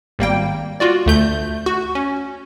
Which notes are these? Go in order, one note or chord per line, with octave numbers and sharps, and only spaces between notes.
G#1 G3 A#3 G5
F4 F#4 D5
D2 A3 G6
F#4
C#4